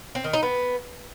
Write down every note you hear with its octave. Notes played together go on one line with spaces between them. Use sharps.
C4
D#3
D#4
B3